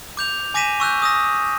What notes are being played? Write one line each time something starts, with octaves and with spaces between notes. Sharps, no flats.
D6 G6 F7
G#5 D6 A#6 B6 D#7 E7
C#6 E6 F#6 G6
D#6 E6 A#6